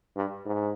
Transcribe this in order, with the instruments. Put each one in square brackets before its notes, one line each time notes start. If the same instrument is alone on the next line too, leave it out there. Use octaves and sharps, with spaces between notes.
[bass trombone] G2
G#2